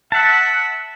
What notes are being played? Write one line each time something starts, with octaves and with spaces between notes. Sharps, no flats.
E5 F#5 A5